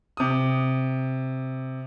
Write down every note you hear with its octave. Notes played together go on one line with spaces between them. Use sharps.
C3 D#6